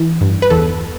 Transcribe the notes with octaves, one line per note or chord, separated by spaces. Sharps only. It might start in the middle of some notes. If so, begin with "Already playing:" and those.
Already playing: E3
G2
B4
E2 A4